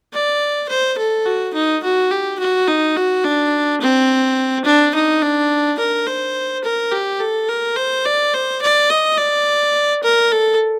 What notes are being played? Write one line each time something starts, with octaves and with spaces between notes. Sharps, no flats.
D5
C5
A4
F#4
D#4
F#4
G4
F#4
D#4
F#4
D4
C4
D4
D#4
D4
A#4
C5
A#4
G4
A4
A#4
C5
D5
C5
D5
D#5
D5
A#4
A4